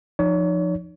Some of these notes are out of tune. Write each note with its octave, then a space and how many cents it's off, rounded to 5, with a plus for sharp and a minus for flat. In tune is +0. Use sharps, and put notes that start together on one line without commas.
F3 +0 D#4 -25 C#5 +35